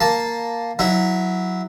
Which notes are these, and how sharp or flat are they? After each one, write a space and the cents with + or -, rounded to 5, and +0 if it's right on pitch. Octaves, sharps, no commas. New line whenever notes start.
A#3 +0 A5 +0
F#3 -10 E4 -15